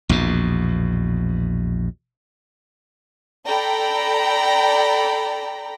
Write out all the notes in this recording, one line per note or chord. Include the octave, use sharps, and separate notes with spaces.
A#1 E2 B2
A4 D5 G5 A#5 B5